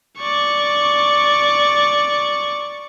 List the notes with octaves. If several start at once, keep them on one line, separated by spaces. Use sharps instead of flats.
D5 C#6